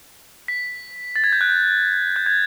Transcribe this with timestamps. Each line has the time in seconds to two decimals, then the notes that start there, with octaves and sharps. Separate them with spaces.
0.48 B6
1.16 A6
1.24 G#6
1.33 G6
1.41 F#6
1.49 G6
2.16 G6
2.26 G#6